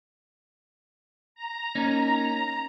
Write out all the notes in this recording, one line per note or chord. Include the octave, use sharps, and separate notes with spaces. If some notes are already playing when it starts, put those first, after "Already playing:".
A#5
A#3 C#4 D#4